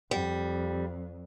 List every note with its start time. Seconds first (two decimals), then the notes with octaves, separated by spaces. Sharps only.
0.11 F2 G3